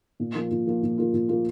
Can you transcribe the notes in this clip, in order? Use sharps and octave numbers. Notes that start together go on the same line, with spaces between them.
A#2
F3 A#3 F4
A#2
F3 A#3 F4
A#2
F3 A#3 F4
A#2
F3 A#3 F4